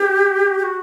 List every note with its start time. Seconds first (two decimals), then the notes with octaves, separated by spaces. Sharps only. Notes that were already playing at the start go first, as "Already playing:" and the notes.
Already playing: G4
0.58 G4
0.63 F#4